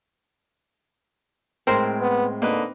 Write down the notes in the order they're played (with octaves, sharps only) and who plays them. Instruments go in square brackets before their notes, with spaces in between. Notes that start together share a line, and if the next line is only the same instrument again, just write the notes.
[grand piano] A2 G#3 [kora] C4 A#4 C5
[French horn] B3
[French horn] D3 [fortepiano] A#3 D#4 B4